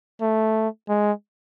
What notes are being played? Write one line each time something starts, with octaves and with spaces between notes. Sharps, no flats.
A3
G#3